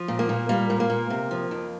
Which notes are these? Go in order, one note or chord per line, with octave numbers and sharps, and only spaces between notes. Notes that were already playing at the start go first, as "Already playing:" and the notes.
Already playing: F3
A#2
A#3
A#2
G3 A#3
A#2
A#3
A#2
C3
F3
F2